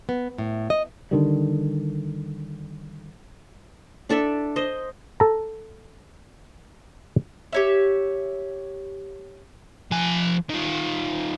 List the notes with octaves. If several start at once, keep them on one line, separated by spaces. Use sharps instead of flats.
B3
A2
D#5
D3 D#3 G3
D4 A4 D5 E5
C5 D#5
A4 A#5
G4 C#5 E5
F3 G#5
D#3 F4